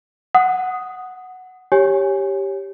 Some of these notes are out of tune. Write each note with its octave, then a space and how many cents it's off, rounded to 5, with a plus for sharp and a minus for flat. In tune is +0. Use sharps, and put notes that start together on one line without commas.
F#5 +0 D#6 +0
G4 +0 C#5 +0 G#5 -10